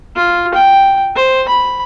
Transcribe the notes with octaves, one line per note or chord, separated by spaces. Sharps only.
F4
G5
C5
B5